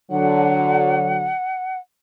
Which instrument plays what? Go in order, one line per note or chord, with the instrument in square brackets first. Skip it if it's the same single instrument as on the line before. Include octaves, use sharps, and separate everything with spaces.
[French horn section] D3 F#3 [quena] F#5